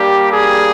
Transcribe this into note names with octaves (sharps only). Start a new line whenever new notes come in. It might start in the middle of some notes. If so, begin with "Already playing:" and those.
Already playing: G3 A#3 D4 G4
G#4